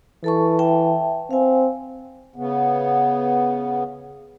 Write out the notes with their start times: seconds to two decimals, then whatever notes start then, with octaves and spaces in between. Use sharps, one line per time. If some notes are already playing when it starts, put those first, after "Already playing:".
0.24 E3 A4 A5 C#6
0.59 E5 G5 A5
1.31 C4 F5 G#5
2.36 C#3 B3